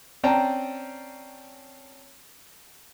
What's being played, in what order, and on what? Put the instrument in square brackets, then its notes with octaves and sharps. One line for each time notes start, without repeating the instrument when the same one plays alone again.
[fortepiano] C4 C#4 D5 G5 A5 A#5